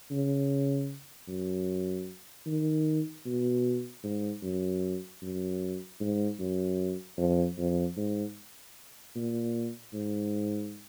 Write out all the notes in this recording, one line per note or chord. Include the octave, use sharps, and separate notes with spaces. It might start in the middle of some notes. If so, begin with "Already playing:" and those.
C#3
F#2
D#3
B2
G#2
F#2
F#2
G#2
F#2
F2
F2
G#2
A#2
G#2